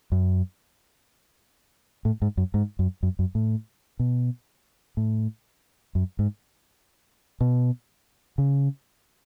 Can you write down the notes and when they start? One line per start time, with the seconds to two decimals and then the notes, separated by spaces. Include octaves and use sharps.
0.12 F#2
2.05 A2
2.22 G#2
2.37 F#2
2.54 G#2
2.79 F#2
3.03 F#2
3.19 F#2
3.35 A2
3.99 B2
4.97 A2
5.95 F#2
6.19 G#2
7.41 B2
8.38 C#3